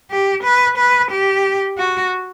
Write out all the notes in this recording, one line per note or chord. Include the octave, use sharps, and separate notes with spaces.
G4
B4
B4
G4
F#4